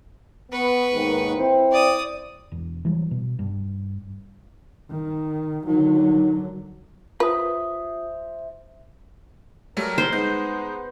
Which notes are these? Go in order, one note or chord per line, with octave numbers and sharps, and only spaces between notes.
B3 B4 C#6
D#2 G#2 D#3
C4 E4 C5
D5 D#6
E1
E3 F#3 G3
B2
G2
D#3
D3 D#3 F#3
F4 B4 C5 E5 D#6
F#3 G3 A3 A#4
C5
G#3 B3 D#4 G6